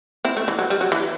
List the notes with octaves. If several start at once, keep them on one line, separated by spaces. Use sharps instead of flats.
C4 E4
A3
E3
F#3
G3
F#3
E3